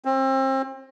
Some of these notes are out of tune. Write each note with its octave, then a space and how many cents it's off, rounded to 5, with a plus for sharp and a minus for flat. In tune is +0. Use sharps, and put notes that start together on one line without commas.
C4 +30